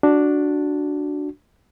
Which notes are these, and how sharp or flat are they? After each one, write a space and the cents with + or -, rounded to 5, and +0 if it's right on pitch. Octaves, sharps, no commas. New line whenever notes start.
D4 +0 F#4 +0